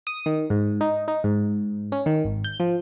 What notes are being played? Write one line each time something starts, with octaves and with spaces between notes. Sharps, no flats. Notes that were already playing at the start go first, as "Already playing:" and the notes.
D#6
D#3
G#2
D#4
D#4
G#2
C#4
D#3
G#1
G6
F3